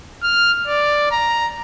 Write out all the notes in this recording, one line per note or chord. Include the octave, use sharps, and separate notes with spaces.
F6
D5
A#5